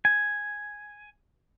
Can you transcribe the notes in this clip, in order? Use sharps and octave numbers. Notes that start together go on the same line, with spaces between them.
G#5